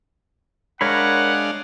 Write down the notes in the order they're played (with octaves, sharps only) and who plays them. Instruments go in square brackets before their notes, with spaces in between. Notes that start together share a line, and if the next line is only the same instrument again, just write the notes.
[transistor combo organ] G#3 D4 F5 [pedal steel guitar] A#4 C#5 B5 [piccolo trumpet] F#5